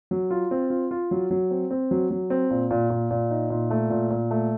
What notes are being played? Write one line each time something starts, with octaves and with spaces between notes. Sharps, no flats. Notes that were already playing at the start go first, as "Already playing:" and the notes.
F#3
F4
C4
F4
F4
F#3
F#3
C4
C4
F#3
F#3
C4
A#2
A#2
A#2
A#2
D#4
A#2
A3
A#2
A#2
A3